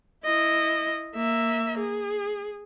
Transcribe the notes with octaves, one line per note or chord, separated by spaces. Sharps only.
E4 D#5
A#3 E5
G#4